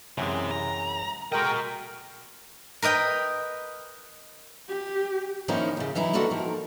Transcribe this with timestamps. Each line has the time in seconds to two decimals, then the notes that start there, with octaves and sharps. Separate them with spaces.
0.18 F#2 C3 E3 G#3
0.51 A#5
1.32 G#3 F#4 A4 A#4 D#5 G5
2.82 A#4 B4 D#5 G5
4.69 G4
5.48 D#3 F3 A#3 C#4 D#4 E4
5.77 D#2 C#3
5.95 E3 F#3 D#4 E4
6.13 G#3 A#3 B3 D4 F#4 A4
6.31 D#3 F3 A#4